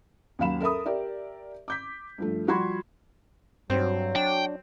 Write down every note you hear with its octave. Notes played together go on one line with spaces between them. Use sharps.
D#2 F#3 C#4 F5 B5 E7
A4 A#4 E5 B5 D#6
G4 A#4 D5 E5
D6 G6 B6
G2 F3 A3
F3 G3 F#4 B5 C6 G#6
G2 F#3 C4
D4 G5